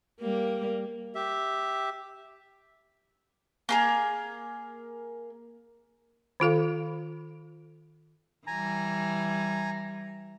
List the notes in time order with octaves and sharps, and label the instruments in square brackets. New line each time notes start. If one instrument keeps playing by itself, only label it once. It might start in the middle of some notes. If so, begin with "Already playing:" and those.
[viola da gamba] G3 A#3
[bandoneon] G4 E5
[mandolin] A#3 G#4 A#4
[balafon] D#3 F4 A4 F5
[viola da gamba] E3 G3 [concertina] G#5 A#5